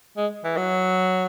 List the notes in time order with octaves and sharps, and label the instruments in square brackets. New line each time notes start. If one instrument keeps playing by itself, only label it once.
[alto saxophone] G#3
E3
F#3